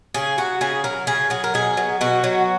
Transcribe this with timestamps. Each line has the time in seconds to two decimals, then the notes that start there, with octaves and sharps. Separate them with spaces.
0.14 C#3 G#4
0.38 F#3 F#4
0.61 C#3 G#4
0.84 F#3 A#4
1.07 C#3 G#4
1.30 F#3 G#4
1.44 A#4
1.54 B2 G#4
1.77 F#3
2.01 B2 F#4
2.24 F#3